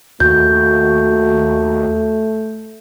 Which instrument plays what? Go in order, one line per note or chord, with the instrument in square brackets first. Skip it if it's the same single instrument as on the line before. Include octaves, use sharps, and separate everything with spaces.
[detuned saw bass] D#2 [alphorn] A3 [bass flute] F#4 [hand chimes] G6